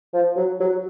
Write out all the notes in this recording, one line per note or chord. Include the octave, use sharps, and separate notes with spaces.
F3
F#3
F#3